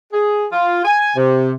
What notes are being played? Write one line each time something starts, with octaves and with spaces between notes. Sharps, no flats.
G#4
F4
G#5
C3